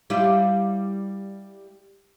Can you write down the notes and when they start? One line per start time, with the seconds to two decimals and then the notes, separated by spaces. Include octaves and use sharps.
0.10 G3 E4 F4